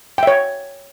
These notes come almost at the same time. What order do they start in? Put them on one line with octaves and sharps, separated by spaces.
G5 E5 C#5